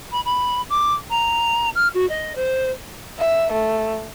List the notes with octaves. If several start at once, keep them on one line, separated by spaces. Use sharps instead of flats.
B5
B5
D6
A#5
F6
F#4
D#5
C5
E5
A3